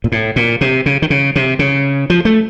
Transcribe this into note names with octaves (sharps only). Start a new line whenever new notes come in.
A#2
A2
A#2
C3
C#3
D#3
C#3
C3
C#3
F3
A3